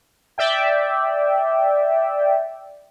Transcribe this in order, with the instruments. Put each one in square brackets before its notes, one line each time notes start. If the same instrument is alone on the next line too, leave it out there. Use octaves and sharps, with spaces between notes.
[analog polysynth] D5 E5 G5